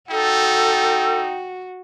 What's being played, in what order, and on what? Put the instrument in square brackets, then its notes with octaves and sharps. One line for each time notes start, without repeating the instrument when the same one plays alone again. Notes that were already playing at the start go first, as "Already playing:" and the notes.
[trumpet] D#4 [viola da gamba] F#4 [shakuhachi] A4 [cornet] G5